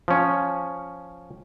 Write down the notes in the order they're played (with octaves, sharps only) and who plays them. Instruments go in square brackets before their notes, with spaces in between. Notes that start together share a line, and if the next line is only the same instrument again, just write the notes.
[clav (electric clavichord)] F3 C#4